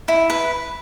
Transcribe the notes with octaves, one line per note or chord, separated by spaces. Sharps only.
E4
B4